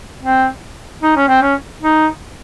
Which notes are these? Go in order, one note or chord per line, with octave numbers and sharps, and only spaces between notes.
C4
D#4
C#4
C4
C#4
D#4